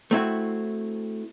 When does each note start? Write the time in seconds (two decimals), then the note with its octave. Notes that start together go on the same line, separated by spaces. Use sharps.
0.11 A3 C4 E4 F#4